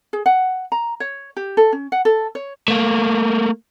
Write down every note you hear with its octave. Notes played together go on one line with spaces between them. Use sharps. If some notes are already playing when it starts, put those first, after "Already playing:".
G#4
F#5
A#5
C#5
G4
A4
C#4
F#5
A4
C#5
A3 A#3